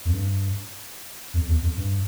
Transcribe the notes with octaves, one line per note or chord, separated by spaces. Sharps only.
F2
G2
F2
E2
F2
G2